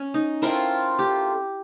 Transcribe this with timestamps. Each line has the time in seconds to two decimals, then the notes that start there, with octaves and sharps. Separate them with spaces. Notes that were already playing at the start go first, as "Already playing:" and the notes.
Already playing: C#4
0.14 D#4
0.42 A3 C4 E4 F4 A#4
0.99 G4